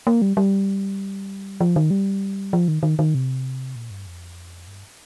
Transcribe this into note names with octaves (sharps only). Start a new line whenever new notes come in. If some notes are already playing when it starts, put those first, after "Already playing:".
A#3
G3
G3
F3
D#3
G3
F3
D#3
D#3
D#3
C3
A#2
G2
F2
G2